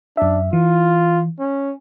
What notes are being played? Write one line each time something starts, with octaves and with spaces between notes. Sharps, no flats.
F#2 D4 E5
E3 F4
C#4